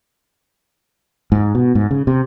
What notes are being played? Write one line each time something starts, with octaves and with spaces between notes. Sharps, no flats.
G#2
B2
G#2
C#3
C3